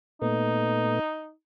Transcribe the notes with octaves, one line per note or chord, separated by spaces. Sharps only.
A#2 A3 B3 D#4